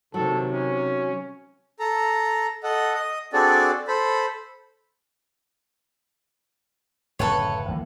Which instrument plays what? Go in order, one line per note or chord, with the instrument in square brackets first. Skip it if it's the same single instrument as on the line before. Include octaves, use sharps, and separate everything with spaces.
[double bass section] C3 D#3 [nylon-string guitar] F#3 [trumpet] A4
[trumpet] C#4
[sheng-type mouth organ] A4 A#5
A4 D#5 F#5
D#5 D#6
C4 D4 F#4 G#4 A4 D5
A4 C5 B5
[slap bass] D1 F#2 C#3 [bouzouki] A4 B4 C#5
[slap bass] D2 E3 A#3